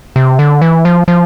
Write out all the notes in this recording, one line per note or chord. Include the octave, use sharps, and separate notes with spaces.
C3
D3
E3
F3
F3